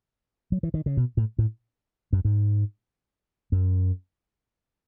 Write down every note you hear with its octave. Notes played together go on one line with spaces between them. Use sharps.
F#3
E3
D#3
C#3
B2
A2
A2
F#2
G#2
F#2